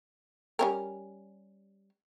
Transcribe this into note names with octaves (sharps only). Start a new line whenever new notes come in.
G3 C#4 A#4